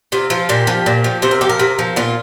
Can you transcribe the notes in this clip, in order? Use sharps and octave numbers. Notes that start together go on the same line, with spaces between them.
C3 F4
F3 F4
A#2 G4
F3
A#2
F3
C3 C5
A#4
F3 G4
A#4
C3
F3
A#2 F4